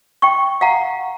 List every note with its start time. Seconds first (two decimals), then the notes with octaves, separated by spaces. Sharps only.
0.22 G5 C#6
0.61 F5 F#5 A#5